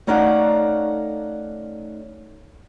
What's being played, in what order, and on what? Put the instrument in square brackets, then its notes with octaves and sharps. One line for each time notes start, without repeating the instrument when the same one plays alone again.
[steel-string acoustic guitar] A3 C#4 D#4 D5 F5 F#5